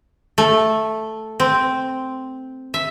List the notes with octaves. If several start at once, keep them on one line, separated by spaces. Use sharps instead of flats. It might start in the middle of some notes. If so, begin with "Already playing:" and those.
A3
C4
E5